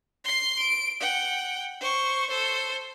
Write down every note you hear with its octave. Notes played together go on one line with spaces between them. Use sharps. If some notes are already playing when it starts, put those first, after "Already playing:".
C6 C7
D7
F#5 G5
C5 C#6
A4 C5